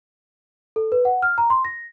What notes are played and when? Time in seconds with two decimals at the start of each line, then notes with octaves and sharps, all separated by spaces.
0.76 A4
0.92 B4
1.05 F#5
1.22 F6
1.38 A#5
1.50 C6
1.65 A#6